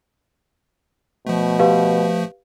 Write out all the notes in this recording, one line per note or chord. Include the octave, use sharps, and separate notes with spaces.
B2 F3 A3
G4 B4 F5